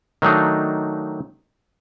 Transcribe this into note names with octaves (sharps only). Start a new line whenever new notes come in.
D#3 F#3 A3 D4 D#4